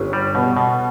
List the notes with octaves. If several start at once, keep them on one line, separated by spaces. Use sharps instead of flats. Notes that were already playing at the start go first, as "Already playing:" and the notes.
Already playing: G1 C#4
G3
B2 B3
B2